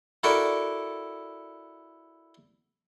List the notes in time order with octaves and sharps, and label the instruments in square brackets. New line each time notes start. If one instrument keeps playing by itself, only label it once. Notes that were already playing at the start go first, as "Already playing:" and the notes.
[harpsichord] E4 F#4 A4 A#4 D5 F#5